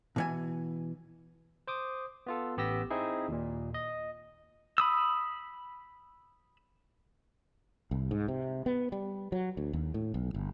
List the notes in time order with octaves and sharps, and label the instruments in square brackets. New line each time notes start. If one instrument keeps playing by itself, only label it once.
[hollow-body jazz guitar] B2 E3 G#5
[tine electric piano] C5 D6 D#6
B3 F4 A4
A1 B3 G4 E6 A#6
C4 D#4 E4 G#4
D#2 A#2
D#5
[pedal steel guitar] B5 D#6 E6
[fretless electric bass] C2
G#2
C3
B3
G3
F#3
D2
D#2
A2
B1
G1